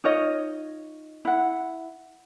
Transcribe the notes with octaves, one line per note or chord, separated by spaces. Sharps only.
D#4 F4 C#5 D#5
E4 F#5